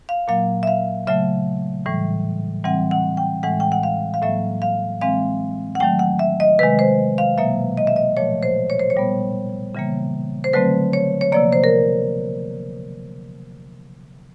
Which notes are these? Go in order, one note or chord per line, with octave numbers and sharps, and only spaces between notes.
F5
A#2 F#3 A#3 F5
E5
F5
C#3 F#3 A3 E5
A2 E3 G3
E3 G3 C4 F#5
F#5
G5
A2 E3 G#3 F#5
G5
F#5
F5
F5
A2 F#3 A#3 E5
F5
E3 G#3 C4 F5
F#5
D#3 F#3 A3 G5
F#5
E5
D#5
C3 D#3 G#3 B4
C5
F5
B2 F#3 A#3 E5
D#5
E5
D#5
A#2 F3 A3 C#5
C5
C#5
C5
C#5
A#2 G3 B3
C#3 E3 G3 A#3
C5
D3 F#3 A3 C4 B4
C#5
C#5
C3 F3 A#3 D5
C5
A#4